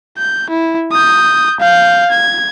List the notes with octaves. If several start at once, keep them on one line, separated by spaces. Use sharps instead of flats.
G6
E4
D#6 G6
F5 G6
G#6